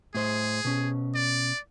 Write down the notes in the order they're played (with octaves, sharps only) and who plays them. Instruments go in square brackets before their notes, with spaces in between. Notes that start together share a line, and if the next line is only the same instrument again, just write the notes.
[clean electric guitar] A2 C5 [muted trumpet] G#4
[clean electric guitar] B2 C#4
[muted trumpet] D5